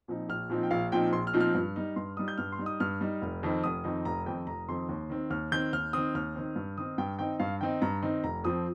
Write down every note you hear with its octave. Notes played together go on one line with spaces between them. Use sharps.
A#2 F3 C4 D#4
A#1 F6
A#2 F3 C4 D#4
G5
A#1 F5
A#2 F3 C4 D#4 G5
A#1 C6
F6
A#2 F3 C4 D#4
F6
G2
G3 D#4
G2 C6
G3 D#4 D#6
G6
G2 F6
C6
G3 D#4
D#6
G2 F6
G3 D#4
F1
F2 D#3 C4 D#4
F1 D#6
F2 D#3 C4 D#4
F1 A#5
F2 D#3 C4 D#4 G5
F1 A#5
F2 D#3 C4 D#4 C6
D#2
D#3 C4
D#2 F6
D#3 C4 G6
D#2 F6
D#3 C4 D#6
D#2 F6
D#3 C4
G2
D#3 C4 D#4 D#6
G2 G5
D#3 C4 D#4 G5
G2 F5
D#3 C4 D#4 G5
G2 A#5
D#3 C4 D#4
F1 A#5
F2 F3 C4 D#6